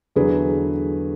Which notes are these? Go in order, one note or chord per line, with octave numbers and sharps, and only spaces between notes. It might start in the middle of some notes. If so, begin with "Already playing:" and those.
E2 D3 F#3 G#4 B4